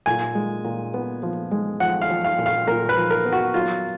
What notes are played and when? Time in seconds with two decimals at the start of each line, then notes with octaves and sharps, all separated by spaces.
0.06 A#2 G#5
0.35 G#3
0.65 A#2
0.94 B3
1.23 F3
1.51 G#3
1.80 F3 F#5
2.01 F5
2.10 F3
2.24 F5
2.38 A#2
2.46 F5
2.67 A#2 A#4
2.89 B4
2.97 F3
3.10 A#4
3.25 B3
3.32 F#4
3.54 F#3 F4